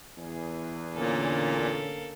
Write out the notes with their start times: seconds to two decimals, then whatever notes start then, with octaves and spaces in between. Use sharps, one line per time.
0.17 E2 G#4
0.94 A#2 D3 A#3 C#4 A4